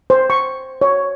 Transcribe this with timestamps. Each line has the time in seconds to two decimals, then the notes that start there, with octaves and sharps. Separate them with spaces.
0.10 C5
0.30 C#6
0.81 C#5